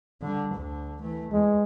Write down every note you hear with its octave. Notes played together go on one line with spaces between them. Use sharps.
D3 G3
D2 D3
E3 A3
E2 G#3